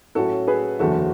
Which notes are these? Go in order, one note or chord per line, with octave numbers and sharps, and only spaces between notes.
A2 F#3 C#4 E4 F#4 A4
G#4 B4
F#1 E2 D3 F#3 F#4 A4